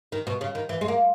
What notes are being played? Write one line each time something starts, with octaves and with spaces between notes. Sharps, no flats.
D#3
B2
C#3
D#3
E3
G#3
A#3